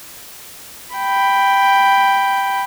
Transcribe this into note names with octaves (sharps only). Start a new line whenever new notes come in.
G5 B5